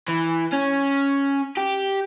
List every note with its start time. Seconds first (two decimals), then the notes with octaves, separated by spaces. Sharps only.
0.08 E3
0.53 C#4
1.57 G4